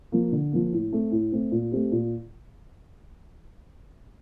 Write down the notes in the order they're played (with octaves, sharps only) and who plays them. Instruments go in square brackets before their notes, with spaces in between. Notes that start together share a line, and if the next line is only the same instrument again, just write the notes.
[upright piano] F3 A#3
D3
F3 A#3
A2
A3 C4
A2
A3 C4
A#2
A3 C4 G4
A#2